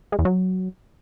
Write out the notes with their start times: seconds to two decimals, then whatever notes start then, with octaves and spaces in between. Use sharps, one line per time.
0.12 G#3
0.19 E2
0.25 F#3